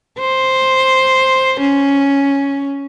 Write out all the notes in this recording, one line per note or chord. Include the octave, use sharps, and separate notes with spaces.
C5
C#4